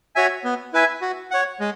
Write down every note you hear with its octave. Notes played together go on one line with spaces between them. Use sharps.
F#4 C#5 E5 G#5
B3
E4 B4 E5 G#5
F#4
C#5 F#5
G#3